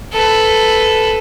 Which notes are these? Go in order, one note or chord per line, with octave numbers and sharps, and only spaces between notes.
A4 B4